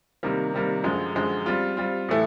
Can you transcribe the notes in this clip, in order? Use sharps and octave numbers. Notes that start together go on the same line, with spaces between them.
C3 D#3 G3 A#3
C3 D#3 G3 A#3
F#2 D3 F3 G#3
F#2 D3 F3 G#3
G3 C4 F4
G3 C4 F4
A2 E3 A3